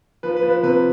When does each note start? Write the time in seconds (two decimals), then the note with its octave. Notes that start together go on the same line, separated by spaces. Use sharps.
0.23 F3 B4
0.36 B4
0.43 F3
0.50 B4
0.63 C3 B4